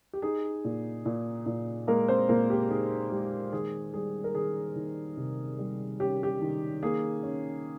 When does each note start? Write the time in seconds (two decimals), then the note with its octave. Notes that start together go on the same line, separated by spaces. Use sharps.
0.13 G4
0.22 D#4 G#4
0.65 A#2
1.06 A#2
1.46 A#2
1.87 G#3 A#3 A#4
2.08 C4 C5
2.29 A#2 A#3 A#4
2.50 G4
2.70 D#4 G#4
3.11 G#3 G4
3.53 D#3 G#4
3.94 G3 G#4
4.24 A#4
4.35 D#3 G#4
4.76 D#3
5.17 C3
5.59 G3
6.00 C#4 G4
6.23 G4
6.41 D#3
6.83 A#3 G#4
7.23 C#4